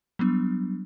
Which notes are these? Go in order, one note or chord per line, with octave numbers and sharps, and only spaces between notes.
F#3 G3 B3 D4